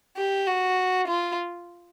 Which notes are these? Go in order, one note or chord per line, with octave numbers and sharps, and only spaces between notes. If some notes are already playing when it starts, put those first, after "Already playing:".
G4
F#4
F4